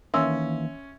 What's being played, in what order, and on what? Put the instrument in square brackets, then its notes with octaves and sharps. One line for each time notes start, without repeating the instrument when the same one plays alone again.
[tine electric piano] D#3 E3 A#3 [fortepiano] C#4 [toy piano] E5 C6 E6